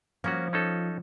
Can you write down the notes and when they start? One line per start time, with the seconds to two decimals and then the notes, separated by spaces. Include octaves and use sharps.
0.24 F3 A#3 C#4 F#4
0.53 C#4 D#4 A4